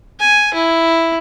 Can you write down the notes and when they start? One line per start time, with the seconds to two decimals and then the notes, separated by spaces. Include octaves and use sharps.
0.20 G#5
0.54 E4